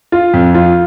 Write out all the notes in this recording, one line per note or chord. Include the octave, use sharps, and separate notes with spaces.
F4
F2
F4